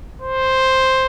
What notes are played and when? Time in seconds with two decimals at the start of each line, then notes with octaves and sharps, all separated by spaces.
0.21 C5